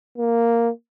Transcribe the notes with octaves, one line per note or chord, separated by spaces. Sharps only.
A#3